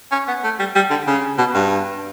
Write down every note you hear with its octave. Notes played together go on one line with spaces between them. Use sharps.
C#4
B3
A3
G3
G3
D3
C#3
B2
G2